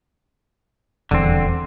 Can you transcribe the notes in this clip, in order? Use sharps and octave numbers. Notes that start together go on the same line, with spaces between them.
D#1 E2 D3 C4